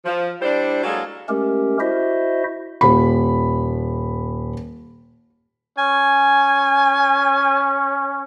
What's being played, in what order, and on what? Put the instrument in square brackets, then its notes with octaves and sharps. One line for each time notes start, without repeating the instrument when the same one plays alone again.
[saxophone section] F3
G3 D4 E4 C5 D5
F#3 G#3 A#3 G#4 A4
[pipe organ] G#3 A3 C#4 G4 A#4
E4 F#4 C5 D#5 E5
[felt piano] D#1 B5
[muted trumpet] C#4 [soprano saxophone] G#5